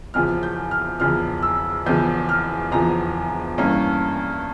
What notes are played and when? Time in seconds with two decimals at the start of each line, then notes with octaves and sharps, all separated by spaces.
0.14 E1 E2 C#3 F3 F6
0.43 G6
0.71 F6
1.00 E1 E2 C#3 F3 F6
1.43 E6
1.86 E1 E2 C#3 F3 G6
2.29 F6
2.72 E1 E2 C#3 F3 A#5
3.58 G2 E3 A#3 C#4